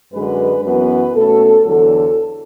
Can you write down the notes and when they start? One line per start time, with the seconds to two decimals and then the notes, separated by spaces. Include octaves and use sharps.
0.12 F#2 D3 G#3 B4
0.64 F#2 E3 B3 B4
1.15 B2 A3 C#4 A4
1.65 E2 D3 F#3 A4